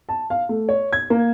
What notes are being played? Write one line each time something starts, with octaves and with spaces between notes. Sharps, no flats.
A5
F5
A3
C#5
G#6
A#3